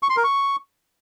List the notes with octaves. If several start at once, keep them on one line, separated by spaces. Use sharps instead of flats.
C#6
C6
A#4
C#6